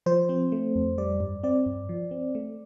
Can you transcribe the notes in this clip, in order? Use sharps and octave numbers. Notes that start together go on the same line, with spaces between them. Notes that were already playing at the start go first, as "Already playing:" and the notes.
F3 C5
C4
A3
F2
G3 D5
G2
C4 D5
G2
F3
C4
A3